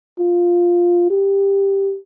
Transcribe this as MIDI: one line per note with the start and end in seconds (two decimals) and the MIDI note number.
0.19 1.06 65
1.10 1.97 67